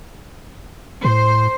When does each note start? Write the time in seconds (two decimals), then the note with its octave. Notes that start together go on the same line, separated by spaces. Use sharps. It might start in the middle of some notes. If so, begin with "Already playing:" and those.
1.04 A2 C5